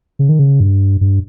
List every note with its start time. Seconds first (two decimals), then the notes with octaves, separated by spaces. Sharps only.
0.19 C#3
0.29 D#3
0.39 C#3
0.60 G2
1.01 G2